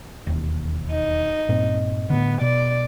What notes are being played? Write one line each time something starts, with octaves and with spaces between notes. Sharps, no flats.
E1 D#2
D#4
G2 A#2 C4
A2 D3 B3
B2 D5